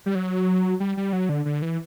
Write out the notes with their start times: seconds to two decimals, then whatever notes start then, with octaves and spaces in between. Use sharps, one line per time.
0.06 G3
0.15 F#3
0.80 G3
0.97 G3
1.13 F#3
1.29 D3
1.45 D3
1.62 E3